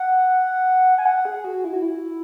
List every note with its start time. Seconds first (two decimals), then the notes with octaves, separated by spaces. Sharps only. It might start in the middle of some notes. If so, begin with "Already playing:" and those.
Already playing: F#5
0.98 G#5
1.05 F#5
1.25 G#4
1.44 F#4
1.64 E4
1.73 F#4
1.82 E4